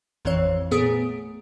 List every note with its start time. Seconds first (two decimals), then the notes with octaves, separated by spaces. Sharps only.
0.25 A1 F2 E3 C4 C#5
0.71 A#2 A3 B3 G#4 D#6 D7